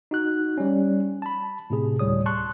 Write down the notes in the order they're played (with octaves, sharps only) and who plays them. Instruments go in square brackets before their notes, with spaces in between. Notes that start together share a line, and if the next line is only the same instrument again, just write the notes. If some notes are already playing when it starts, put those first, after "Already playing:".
[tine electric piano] D#4 F#4 F#6
G3 C#4
A5 B5
A2 C3 G#4
D2 A2 G3 C#5 D#6
A5 C6 C#6 F#6